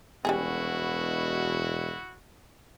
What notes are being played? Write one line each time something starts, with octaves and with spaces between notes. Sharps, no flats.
E1 B2 G3 C#4 E4 F#4 G#4